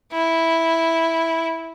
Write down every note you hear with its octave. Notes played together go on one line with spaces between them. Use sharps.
E4